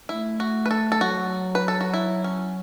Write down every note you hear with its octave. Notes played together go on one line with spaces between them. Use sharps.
A3 E4
F#4
B4
A4
A4
F#3 F#4
B4
A4
F#4
E4
C#4